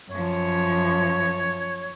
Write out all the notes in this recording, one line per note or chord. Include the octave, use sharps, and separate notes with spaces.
F#2 F3 C#5